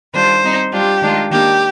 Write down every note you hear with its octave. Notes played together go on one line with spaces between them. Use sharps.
D#3 G3 D4 F4 C5
G3 C4 D#4
G3 D4 F4 G4
D#3 G#3 D4 F4
D#3 A#3 D4 G4